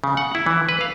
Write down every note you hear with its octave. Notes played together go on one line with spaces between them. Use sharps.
C#3
F#5
E4
E3
B4
F5